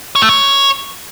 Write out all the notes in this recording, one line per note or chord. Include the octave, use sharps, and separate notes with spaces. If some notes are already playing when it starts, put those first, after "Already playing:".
C#5
A3
C#5